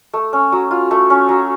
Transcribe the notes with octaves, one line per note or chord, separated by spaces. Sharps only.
A3
C#4
F#3
F4
A3
C#4
F#3